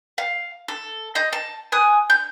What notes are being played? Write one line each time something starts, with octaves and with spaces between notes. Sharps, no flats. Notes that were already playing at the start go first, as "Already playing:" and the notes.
F5
A4
D#5 G6
A5
G#5 D#6 F#6
G6